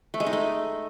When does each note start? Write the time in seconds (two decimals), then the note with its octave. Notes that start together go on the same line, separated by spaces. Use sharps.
0.14 A3
0.20 G#3
0.26 D#4
0.33 A3